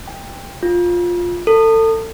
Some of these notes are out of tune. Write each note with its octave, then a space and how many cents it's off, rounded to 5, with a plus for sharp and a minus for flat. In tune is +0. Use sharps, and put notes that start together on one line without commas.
G5 +15
F4 +10
A4 +30